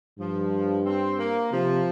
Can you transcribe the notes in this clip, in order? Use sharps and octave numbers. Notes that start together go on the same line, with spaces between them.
G2 F3
C4
A#3
C3 F3